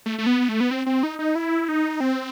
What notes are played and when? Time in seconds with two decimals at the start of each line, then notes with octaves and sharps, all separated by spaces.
0.06 A3
0.19 A3
0.26 B3
0.49 A3
0.60 B3
0.71 C4
0.86 C4
1.03 D#4
1.19 D#4
1.35 E4
1.69 D#4
2.00 C4